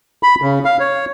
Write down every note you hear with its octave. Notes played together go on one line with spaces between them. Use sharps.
B5
C#3
F5
C#5